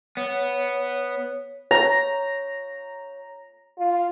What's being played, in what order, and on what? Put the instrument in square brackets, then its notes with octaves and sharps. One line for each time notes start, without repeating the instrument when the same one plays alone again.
[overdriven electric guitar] B3 [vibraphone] C#5
[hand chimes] C#5 [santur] A#5
[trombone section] F4